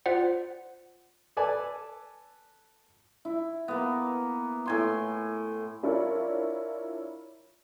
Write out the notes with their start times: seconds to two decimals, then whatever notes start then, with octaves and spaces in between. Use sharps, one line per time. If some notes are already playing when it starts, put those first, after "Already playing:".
0.06 F4 C5 D5 F#5
1.37 A4 B4 D5 G#5 A5
3.25 E4
3.68 A#3 B3
4.66 A2 G#5 C6
5.83 D4 E4 F4 A#4 C#5 D5